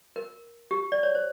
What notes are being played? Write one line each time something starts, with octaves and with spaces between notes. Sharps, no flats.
A#4
G4
D5
C#5
C5